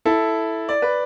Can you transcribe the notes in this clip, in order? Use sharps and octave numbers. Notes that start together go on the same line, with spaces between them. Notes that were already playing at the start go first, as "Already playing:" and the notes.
E4 A4
D5
B4